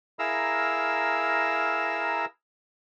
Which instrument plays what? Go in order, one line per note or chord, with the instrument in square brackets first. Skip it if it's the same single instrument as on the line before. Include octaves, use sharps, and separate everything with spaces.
[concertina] E4 G#4 A#4 F5 A#5 E6